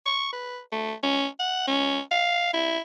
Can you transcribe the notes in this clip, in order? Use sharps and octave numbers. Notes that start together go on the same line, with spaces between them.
C#6
B4
A3
C#4
F#5
C#4
F5
E4